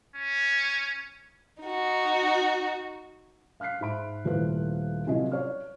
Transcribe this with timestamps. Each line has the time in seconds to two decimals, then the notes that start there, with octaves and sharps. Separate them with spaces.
0.16 C#4
1.63 D#4 F#4
3.60 F5 F6 F#6 B6 C7
3.81 G#2 E5 B5 D7
4.25 D#1 F3 A3 E4 B4 F#6
5.07 C2 F#3 C#4 E4 F4 D#5
5.32 C#5 F6